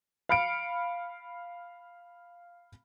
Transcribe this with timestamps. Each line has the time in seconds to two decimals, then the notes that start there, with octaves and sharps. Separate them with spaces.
0.29 F5 B5 F6 C#7 D7